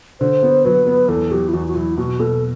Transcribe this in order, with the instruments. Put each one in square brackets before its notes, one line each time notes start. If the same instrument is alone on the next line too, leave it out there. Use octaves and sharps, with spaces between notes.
[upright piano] D3 [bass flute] C5
[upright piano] B3
[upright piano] F#3 [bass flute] B4
[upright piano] B3
[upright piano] E2 [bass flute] A4
[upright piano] F#3 [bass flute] G4
[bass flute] E4
[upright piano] E2 [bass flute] F#4
[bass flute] F#4
[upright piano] F#3 [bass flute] E4
[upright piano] B2 [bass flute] F#4
[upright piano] B2 [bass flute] A4